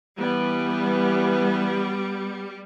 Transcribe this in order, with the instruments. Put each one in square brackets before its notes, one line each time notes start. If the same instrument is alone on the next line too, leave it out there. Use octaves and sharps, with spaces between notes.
[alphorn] E3 [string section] G3 [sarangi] B3